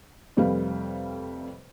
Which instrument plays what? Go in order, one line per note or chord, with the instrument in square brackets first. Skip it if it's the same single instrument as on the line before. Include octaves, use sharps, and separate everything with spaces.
[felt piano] F2 C3 G3 A3 B4 F5